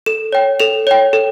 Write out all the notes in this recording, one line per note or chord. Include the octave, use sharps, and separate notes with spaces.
A4 E7
C#5 G5
A4 F7
C#5 G5
A4